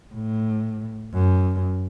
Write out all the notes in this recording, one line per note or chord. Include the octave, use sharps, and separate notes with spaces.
A2
F#2